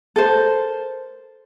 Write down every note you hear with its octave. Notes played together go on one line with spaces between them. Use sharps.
A4 A#4 C5